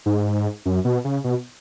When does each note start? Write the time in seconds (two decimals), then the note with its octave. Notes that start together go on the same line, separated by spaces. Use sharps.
0.06 G#2
0.66 F#2
0.85 B2
1.04 C#3
1.24 B2